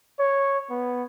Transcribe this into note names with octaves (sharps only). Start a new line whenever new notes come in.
C#5
B3